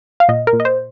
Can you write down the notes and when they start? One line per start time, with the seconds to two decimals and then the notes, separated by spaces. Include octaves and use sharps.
0.20 F5
0.28 A#2 D#5
0.47 A#4
0.53 A#2
0.60 D#5
0.65 C5